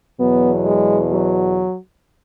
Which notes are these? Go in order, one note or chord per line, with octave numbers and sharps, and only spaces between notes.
E2 B2 F#3 B3
G#3
F#3